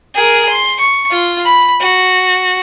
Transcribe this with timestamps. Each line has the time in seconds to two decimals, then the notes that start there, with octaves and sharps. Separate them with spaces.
0.15 G#4 A#4
0.49 C6
0.80 C#6
1.11 F4
1.45 B5
1.81 F#4